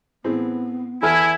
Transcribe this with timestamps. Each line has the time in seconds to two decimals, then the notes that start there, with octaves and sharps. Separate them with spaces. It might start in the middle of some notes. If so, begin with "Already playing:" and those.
0.24 A2 B3 C4 G#4
1.03 E2 E4 A4 G#5 F6